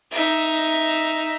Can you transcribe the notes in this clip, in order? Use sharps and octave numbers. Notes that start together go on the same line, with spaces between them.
D#4 E5